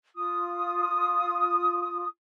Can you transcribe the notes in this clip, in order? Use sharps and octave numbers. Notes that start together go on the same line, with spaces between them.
F4 D#6